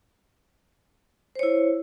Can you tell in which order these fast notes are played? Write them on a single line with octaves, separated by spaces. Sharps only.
C5 C#5 E4